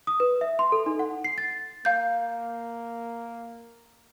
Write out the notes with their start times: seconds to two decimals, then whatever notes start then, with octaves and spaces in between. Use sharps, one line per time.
0.07 D#6
0.20 B4
0.41 E5
0.59 C6
0.72 A4
0.86 D#4
0.99 F#5
1.24 C7
1.38 A6
1.85 A#3 F5 G6